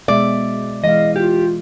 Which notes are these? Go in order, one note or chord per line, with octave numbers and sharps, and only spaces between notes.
B2 G#3 D5 E5
E3 G#3 D#5 F5
F4 G4